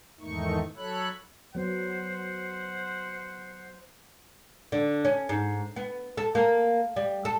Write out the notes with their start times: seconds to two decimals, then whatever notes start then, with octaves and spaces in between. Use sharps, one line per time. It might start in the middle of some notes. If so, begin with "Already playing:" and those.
0.20 E2 G#2 D#3 A3 D#4 C#6
0.76 F#3 A4 C#5 B5 F#6
1.55 F#3 B3 C5 F#5
4.72 D3
5.05 C#4
5.29 G#2
5.76 B3
6.17 A4
6.35 A#3
6.96 G3
7.25 A4